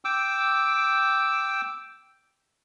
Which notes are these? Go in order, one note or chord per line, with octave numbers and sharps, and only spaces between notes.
G5 D6 E6